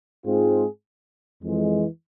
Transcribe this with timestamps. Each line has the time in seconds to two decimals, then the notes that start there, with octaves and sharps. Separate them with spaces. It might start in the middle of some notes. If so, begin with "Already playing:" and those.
0.24 G#2 G#3 C4 F4 G#4
1.43 F2 E3 G#3